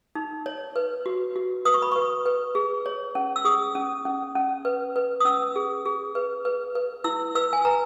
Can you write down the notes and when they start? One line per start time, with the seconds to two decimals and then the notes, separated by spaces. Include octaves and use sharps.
0.15 D#4
0.46 C#5
0.76 B4
1.06 F#4
1.36 F#4
1.65 B4 D#6
1.74 C#6
1.82 B5
1.92 B4 C#6
2.26 B4
2.55 G#4
2.86 C#5
3.15 C#4
3.36 E6
3.45 G#4 D#6
3.75 C#4
4.05 C#4
4.36 C#4
4.65 B4
4.96 B4
5.20 D#6
5.25 C#4 E6
5.56 G#4
5.85 G#4
6.15 B4
6.45 B4
6.75 B4
7.04 E4 E6
7.35 B4 E6
7.53 G#5
7.65 B4 A#5